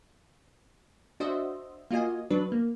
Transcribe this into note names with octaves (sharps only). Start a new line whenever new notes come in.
D4 F#4 C5 D#5 E5
A#3 F4 F#4 D#5 G#5
F#3 D4 B4
A#3